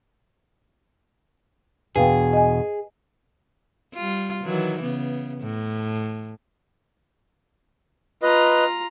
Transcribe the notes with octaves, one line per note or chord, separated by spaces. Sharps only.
E2 B2 D4 G#4 B4 F5 G5
D#5 G#5
G3 F4
D#3 E3 F#3
C#3 B3
A2
F4 B4 D#5 A#5